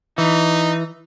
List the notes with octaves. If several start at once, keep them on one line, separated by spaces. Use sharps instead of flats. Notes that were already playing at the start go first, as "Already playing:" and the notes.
E3 D#4